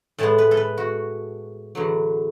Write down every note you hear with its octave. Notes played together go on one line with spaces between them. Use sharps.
A2 G#3 B3 A5
B4
A4
B4
F#4
E2 D3 F#3